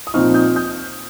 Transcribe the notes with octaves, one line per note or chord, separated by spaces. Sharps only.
D#6
A#2 F3 C4 D#4 C#6 F6
D#6 G6
D#6 G6